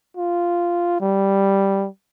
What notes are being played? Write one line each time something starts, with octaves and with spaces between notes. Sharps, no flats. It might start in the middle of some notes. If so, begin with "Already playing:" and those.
F4
G3